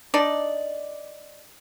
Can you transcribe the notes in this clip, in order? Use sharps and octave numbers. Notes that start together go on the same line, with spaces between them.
D4 D#4 D5